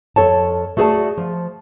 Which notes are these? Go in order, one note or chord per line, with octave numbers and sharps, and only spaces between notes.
F2 C3 A4 C#5 A5
A3 F#4 G#4 C5 D5 A5
F3